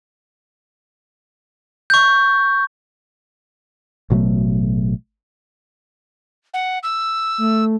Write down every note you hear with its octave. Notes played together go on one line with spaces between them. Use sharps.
C#6 G6
A1 B2 F#3 A3
F#5
E6
A3